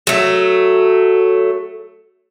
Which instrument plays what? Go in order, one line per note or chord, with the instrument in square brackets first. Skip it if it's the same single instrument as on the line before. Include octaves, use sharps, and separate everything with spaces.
[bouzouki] F#3 A3